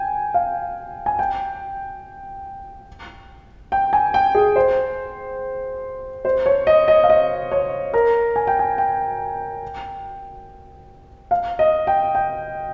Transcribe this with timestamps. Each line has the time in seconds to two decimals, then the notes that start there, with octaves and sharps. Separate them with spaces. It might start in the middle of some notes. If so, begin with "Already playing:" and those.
Already playing: G5 G#5
0.34 F5
1.06 G#5
1.19 G5
3.72 G5
3.93 G#5
4.14 G5
4.35 G#4
4.56 C5
6.25 C5
6.46 C#5
6.67 D#5
6.88 D#5
7.03 F5
7.10 D#5
7.51 C#5
7.94 A#4
8.36 G#5
8.47 G5
8.59 G#5
8.78 G5
11.31 F5
11.59 D#5
11.87 G5
12.15 G5